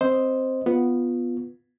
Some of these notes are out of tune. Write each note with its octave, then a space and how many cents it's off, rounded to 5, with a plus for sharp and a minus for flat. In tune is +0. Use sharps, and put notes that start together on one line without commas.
C4 +0 C5 +0 D#5 +0
B3 +0 F4 +0